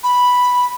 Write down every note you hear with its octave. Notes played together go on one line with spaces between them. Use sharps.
B5